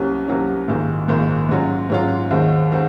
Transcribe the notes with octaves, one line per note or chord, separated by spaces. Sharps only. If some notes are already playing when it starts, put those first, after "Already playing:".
Already playing: C2 C3 F#3 A#3 C#4
C2 C3 F#3 A#3 C#4
A#1 G#2 D#3 A#3
A#1 G#2 D#3 A#3
G#2 F#3 C#4 F4
G#2 F#3 C#4 F4
D#2 D#3 G#3 C4 F#4
D#3 G#3 C4 F#4